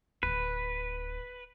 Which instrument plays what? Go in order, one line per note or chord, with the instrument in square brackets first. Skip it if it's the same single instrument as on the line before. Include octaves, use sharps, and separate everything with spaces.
[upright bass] D1 D3 [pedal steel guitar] B4